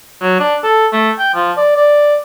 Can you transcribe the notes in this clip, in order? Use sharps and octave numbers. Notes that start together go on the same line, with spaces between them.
F#3
D4
A4
A3
G5
F3
D5
D5